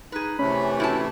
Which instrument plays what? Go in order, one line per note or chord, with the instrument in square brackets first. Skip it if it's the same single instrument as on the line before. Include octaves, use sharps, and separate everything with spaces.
[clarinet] D#4 [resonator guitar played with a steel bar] G#4 B4
[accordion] C3 E3 A3 [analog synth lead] C#4 [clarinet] B5
[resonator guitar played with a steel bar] A2 E4 A5 [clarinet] F#4